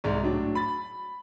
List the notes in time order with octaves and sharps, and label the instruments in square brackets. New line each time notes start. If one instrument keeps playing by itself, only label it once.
[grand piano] C2 G#2
A2 F#3 D4
B5 A6